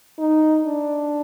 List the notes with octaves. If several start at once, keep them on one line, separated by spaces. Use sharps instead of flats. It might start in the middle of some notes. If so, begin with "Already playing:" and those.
D#4
D4